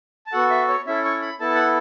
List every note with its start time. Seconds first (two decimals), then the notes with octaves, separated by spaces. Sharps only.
0.26 A5
0.32 B3 F#4 A4 F#5
0.50 E5
0.68 C#5
0.86 C#4 E4 A4 E5
1.05 C#6
1.22 B5
1.40 B3 E4 A4 A5
1.55 F#5